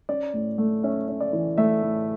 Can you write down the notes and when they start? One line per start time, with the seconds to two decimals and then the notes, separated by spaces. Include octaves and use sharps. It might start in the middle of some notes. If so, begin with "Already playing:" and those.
0.09 C#4 D5
0.34 A2
0.58 A3
0.84 C#4 E5
1.08 C#4
1.21 D5
1.33 E3
1.58 A3 E5
1.83 A2